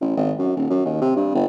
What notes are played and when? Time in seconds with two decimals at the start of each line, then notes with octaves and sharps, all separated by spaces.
0.01 A1
0.16 G#1
0.38 F#2
0.56 D#1
0.70 F#2
0.85 D#2
1.01 C3
1.16 G2
1.35 G1